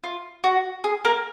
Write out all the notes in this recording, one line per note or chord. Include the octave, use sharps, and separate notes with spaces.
F4
F#4
G#4
A#3 A#4